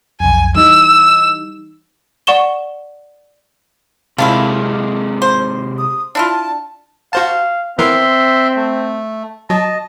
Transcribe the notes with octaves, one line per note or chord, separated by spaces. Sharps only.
B1 F2 G#5
E3 G3 D#4 E6
D5 F#5 C#6 E7 G7
C3 D#3 F3 G#3 E4 F5 A5
C5
D#6
D4 E4 F4 A5
F#4 C5 F5 A5
E3 B3 C4 A#4 E5 C6
A3
F#3 D#5 A5